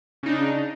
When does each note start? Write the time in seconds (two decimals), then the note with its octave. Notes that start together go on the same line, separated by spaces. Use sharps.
0.23 C#3
0.26 D#4
0.29 D4